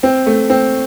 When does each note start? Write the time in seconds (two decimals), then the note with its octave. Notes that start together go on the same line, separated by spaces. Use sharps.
0.03 C4
0.26 A3
0.50 C4